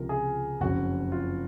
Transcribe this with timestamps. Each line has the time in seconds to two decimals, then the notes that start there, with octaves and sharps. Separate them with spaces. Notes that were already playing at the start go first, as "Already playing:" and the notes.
Already playing: C#2 C3 F3 A#4
0.09 G#4
0.60 F#1 F2 C#3 F#4
1.12 F4